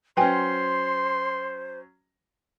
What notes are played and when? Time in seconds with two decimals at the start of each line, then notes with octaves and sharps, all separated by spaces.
0.17 F#3 C#4 B4 C5 G5 G#5 C6